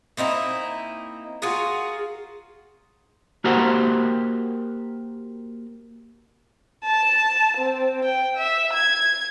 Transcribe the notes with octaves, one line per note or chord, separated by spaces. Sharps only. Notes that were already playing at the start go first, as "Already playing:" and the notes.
A#3 C4 D#4 E4
F4 F#4 G#4 A#4
A#3 F#4 G4 A#4 C5 F#5
A5
C4
G5
E5
G#6